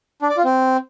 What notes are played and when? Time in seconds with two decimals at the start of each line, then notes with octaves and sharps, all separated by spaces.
0.22 D4
0.29 D5
0.37 F4
0.45 C4